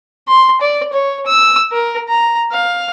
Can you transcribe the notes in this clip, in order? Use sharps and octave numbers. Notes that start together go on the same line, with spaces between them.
C6
D5
C#5
E6
A#4
A#5
F5